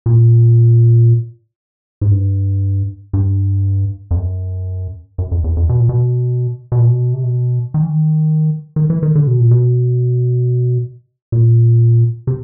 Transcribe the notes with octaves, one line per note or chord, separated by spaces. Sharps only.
A#2
G#2
G2
G2
F2
F#2
F#2
F2
E2
F2
B2
A#2
B2
B2
A#2
B2
C3
B2
D#3
E3
D#3
D#3
E3
D#3
D3
B2
A#2
B2
A#2
C3